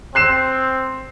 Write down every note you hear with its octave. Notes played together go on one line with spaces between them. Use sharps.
C4 F#6 C7 E7